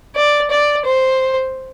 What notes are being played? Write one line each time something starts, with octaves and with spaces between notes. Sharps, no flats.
D5
D5
C5